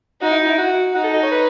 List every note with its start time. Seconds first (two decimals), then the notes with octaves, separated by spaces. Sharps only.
0.21 D#4 F#4
0.31 E4
0.49 E4
0.58 F#4
0.94 D#4 F#4
1.04 A4
1.13 D#5
1.22 C#5
1.32 B4